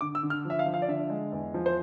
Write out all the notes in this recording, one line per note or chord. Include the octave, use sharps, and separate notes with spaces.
D3 D6
E6
D3
F6
F3 E5
F5
F3
F5
D5
D3 E5
G#3
E2
F3
C5